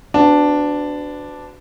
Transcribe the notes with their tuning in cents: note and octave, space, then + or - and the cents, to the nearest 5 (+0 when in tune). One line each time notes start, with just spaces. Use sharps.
B3 +35 D4 +0 F#4 +0